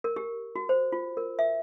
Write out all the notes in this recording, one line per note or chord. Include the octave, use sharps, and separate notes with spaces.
A#4
G4
F#4
C5
F4
A#4
E5